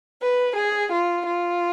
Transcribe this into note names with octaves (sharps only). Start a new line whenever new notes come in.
B4
G#4
F4
F4